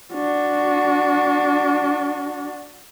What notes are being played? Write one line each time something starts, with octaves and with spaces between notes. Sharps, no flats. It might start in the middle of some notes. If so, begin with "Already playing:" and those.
D4 F#4